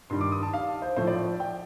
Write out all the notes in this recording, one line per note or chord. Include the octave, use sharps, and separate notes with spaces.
G2 D#3 G3 C6
D6
D#6
A5
F5
C5
A2 F3 A3 C5
D5
G5